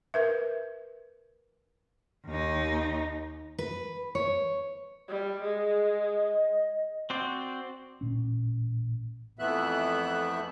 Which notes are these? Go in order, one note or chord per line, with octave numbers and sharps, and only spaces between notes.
A#4 B4 E5
D#2 D#4
B4
C#5
G3
G#3 G#4
D#5
C4 F#4 C5 D5
A1 A#2 C#4
F2 E3 A3 B3 E5 F#6